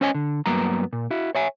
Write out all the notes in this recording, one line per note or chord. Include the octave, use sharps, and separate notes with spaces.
C#4 C5 C#5 D#5 G#5
D3
G2 F#3 A#3 B3 A#5
A#2
E4 F#4
C#5 E5 G#5